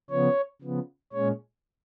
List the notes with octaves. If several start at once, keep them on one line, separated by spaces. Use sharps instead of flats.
C#3 F3 B3 C#5
C#3 F3 B3
A#2 G#3 C#4 C#5